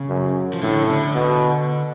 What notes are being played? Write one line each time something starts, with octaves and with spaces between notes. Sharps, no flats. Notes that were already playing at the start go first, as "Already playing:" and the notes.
Already playing: C#3
F#2
F3
A2 D3
C#3
D3
B2